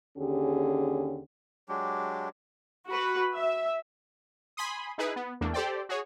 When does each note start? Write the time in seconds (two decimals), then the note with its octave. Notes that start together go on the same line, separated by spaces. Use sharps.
0.18 D#2 D3 C#4 G4 G#4
1.69 F#3 G#3 D4 G4
2.86 F#4 B4
3.35 E5
4.57 G#5 B5 C6 D#6
4.98 D#4 E4 G#4 B4
5.16 B3
5.41 E2 A3 A#3 D4
5.54 G4 A4 C5 D5 G5
5.89 F#4 G#4 C#5